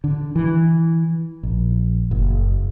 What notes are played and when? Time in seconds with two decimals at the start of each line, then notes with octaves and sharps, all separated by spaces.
0.04 D3
0.36 E3
1.43 A#1
2.11 F#1